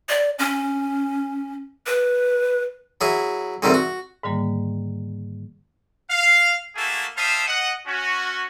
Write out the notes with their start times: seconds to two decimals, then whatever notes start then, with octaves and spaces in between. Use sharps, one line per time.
0.09 D5
0.39 C#4
1.86 B4
3.01 F#3 E4 G#4
3.62 D2 G#2 C3 D#3 G3 C4
3.74 F#4
4.23 G#2 D3 D#3 G3 A#3
6.10 F5
6.75 A3 A#3 F#4 G#4 E5 A5
7.17 G3 C5 E5 F5 A5 D#6
7.47 D#5 F#5
7.87 C#4 F#4